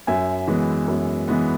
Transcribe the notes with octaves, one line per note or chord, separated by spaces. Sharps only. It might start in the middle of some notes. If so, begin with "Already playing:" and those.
F#2 E5 G#5
E3 G#3 B3
F#2
E3 G#3 B3